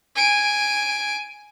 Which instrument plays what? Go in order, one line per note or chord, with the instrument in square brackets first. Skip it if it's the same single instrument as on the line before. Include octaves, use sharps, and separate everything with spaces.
[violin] G#5 D7